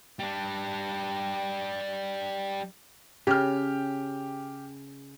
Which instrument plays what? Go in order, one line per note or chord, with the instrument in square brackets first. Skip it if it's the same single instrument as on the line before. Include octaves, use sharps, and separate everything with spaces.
[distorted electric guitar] G3 D4
[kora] C#3 [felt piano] G4 F6